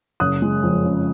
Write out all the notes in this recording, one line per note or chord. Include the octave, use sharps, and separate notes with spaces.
F#1 D#6 F#6
G#3
F2
C#3